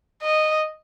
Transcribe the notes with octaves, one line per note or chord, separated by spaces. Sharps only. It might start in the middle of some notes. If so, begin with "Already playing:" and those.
D#5